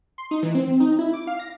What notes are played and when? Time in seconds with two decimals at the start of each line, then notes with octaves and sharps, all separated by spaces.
0.18 C6
0.31 D#4
0.43 E3
0.55 C4
0.80 D#4
0.99 E4
1.13 D6
1.27 F5
1.39 A#6